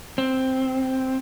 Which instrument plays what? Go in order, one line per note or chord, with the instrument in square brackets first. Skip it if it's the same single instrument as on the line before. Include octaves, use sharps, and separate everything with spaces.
[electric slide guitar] C4